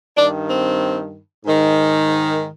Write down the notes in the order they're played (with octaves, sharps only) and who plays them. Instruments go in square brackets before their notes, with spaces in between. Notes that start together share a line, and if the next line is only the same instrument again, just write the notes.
[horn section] G2 D#3 D4
C4
G#2 D#3